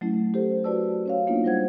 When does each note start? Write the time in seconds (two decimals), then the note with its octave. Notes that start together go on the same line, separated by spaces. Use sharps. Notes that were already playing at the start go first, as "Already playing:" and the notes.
0.01 F#3 A3 C#4 E4
0.34 G4 A4 C5
0.64 F#4 B4 D5 A5 E6
1.06 C#4 C#5 F5
1.27 A#3 B3 D4 D#4 F4
1.44 G3 F4 C5 F#5 G#6